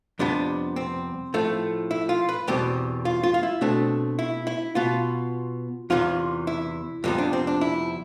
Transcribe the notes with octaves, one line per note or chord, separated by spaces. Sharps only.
F2 C3 G3 B3 D4
C4
A2 F3 A3
E4
F4
B4
E2 B2 G3 C4 G4
F4
F4
F4
E4
B2 A3 C4 D4
E4
E4
B2 B3 F4
E2 C3 E3 F4
E4
F2 C3 G3 B3 C4
D4
C4
D4
E4